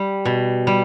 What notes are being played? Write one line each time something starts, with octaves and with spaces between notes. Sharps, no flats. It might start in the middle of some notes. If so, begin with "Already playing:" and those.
Already playing: G3 G4
B2
G3